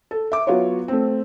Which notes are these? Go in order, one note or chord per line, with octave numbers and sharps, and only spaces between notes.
A4
E5 D6
F#3 B3 F4 F#4 C#5
A3 C4